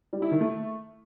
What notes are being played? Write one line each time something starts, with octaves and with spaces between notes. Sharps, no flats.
G3
E4
D#3
A3